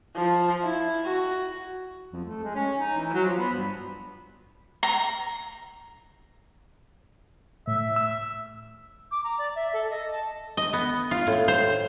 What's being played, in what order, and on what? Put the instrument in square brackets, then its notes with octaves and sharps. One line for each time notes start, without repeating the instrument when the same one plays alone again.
[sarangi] F3
E4
F#4
[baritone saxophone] F2
A3
G#3
C#4
D#4
E3
F#3
F3
B3
G2
[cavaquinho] A#5
[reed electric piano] A2 [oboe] E5
[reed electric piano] E6
[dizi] D6
A#5
D5
E5
A4
D#5
A5
[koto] D#5
B3
F4
A2
C5